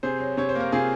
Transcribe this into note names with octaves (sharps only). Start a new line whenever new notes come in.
C3 G#4 C5
F#3
C3 C#5
C5
A#3 A#4
C3 F4 G#4